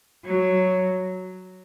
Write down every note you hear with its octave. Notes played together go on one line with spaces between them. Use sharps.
F#3